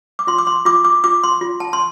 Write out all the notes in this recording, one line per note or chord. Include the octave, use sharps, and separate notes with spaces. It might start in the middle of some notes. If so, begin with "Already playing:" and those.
D6
F4 C6
D6
C6
F4 D6
D6
F4 D6
C6
F4
A5
C6